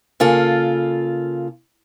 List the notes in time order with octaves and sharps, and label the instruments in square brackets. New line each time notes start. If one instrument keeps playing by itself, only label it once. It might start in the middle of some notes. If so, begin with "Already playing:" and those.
[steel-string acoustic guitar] C#3 A#3 F4 A4